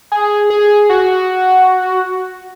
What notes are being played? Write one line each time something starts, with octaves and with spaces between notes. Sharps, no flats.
G#4
G#4
F#4